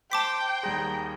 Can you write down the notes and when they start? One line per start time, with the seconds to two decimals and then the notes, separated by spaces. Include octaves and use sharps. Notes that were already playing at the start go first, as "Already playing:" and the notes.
0.12 C5 G5 A5 D6 B6
0.63 D#2 G3 G#4 A#5